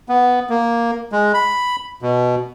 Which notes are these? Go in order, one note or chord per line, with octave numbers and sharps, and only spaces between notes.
B3
A#3
G#3
B5
B2